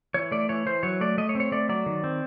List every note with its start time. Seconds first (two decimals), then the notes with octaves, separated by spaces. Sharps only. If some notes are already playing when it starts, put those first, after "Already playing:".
0.14 E3 C#5
0.31 A3 D5
0.49 E3 C#5
0.66 E3 C5
0.83 F#3 C#5
1.01 A3 D5
1.18 A3 D#5
1.29 C#5
1.35 C4
1.40 C#5
1.52 A3 D5
1.69 F#3 D5
1.86 D#3
2.04 C4